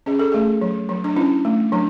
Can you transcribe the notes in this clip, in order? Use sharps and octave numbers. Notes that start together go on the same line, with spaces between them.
C#4 G#4
A4
A3 G#4
F#3
F#3
D4
C#4 E4
A3
F#3 D4